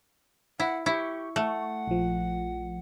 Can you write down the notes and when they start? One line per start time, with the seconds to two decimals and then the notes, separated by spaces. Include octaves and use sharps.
0.60 E4 F#5
0.86 E4 G4 C#6
1.36 A3 F#5
1.88 A#1 F3